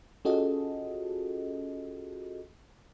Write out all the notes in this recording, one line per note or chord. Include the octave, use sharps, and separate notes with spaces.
C#4 F4 F#4 G#4 A4 D#5